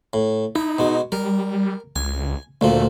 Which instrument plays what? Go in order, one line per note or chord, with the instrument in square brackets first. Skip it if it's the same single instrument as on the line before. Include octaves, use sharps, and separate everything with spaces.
[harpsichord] A2
[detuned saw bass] D#4 [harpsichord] E4
[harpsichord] B2 G#3
[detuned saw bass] G3 [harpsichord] A#4
[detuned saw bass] C#2 [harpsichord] G#5
[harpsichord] D2 A#2 F3 [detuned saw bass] A3